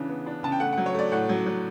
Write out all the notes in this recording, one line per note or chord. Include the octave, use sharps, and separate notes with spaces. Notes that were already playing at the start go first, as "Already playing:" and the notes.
Already playing: C#3 E3 D4
B3
D4
C#3 A5
G5
A3 F#5
F#3 F#5
C#5
A3 D5
A2 F#5
F#3
F#3